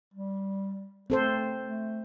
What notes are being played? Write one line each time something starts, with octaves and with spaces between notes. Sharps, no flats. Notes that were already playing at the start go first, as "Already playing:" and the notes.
G3
A3 C4 A4 C5
A3